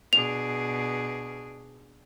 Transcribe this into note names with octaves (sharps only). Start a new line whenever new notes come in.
B2 D4 G#4 F7